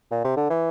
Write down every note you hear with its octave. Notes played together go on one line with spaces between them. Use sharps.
A#2
C3
D3
E3